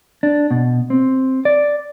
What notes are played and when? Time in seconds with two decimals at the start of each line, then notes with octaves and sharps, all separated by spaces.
0.23 D4
0.51 B2
0.90 C4
1.45 D5